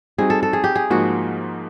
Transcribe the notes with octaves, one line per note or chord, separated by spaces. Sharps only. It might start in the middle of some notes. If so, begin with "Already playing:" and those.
G3 C4 D#4 F#4 G#4
A4
A4
G#4
G4
G#4
G#2 F3 A#3 D#4 F#4